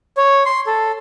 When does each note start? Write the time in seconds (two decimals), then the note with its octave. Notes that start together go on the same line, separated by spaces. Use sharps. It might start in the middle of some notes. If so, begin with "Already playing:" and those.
0.17 C#5
0.46 C6
0.67 A4